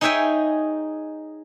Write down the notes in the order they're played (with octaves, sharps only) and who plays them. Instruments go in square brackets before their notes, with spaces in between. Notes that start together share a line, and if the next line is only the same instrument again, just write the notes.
[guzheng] D#4 G#4 C#5 E5 G5 G#5